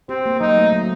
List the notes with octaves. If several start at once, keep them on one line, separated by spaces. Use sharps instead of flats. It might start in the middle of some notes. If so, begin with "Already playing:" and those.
C4 G4
A#3
F#3 D#4
A3
F#3